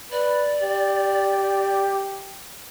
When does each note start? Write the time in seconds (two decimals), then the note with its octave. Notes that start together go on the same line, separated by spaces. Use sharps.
0.12 B4 D5
0.63 G4